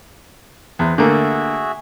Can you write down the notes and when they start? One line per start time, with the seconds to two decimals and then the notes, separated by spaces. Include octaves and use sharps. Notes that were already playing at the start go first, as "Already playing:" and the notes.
0.79 E2 C4 B4
0.98 D3 A3 A#3 F#4 G#4 E5